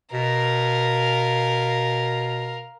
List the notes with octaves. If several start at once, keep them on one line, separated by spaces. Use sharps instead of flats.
B2 A#4 F5